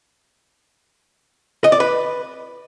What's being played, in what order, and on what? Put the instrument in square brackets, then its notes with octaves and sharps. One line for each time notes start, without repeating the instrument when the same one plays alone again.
[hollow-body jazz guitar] D#5
D5
B4